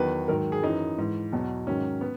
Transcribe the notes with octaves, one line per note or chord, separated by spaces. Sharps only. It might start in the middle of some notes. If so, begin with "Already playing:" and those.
Already playing: E2 D#3 F#3 B4
G#2 D#3 F#3 A#4
G#4
F#2 E3 D#4
G#2 E3
E2 B2 F#3
G#2 D#3 F#3 C#4
B3